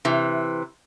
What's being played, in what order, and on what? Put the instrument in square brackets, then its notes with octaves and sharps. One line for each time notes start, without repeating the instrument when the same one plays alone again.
[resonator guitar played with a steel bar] C3 E3